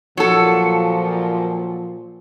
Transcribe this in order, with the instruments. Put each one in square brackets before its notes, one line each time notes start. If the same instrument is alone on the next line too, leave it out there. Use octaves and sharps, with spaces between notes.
[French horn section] A#2 F3 [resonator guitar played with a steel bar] F#3 A4